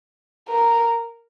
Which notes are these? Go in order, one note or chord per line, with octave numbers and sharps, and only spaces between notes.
A#4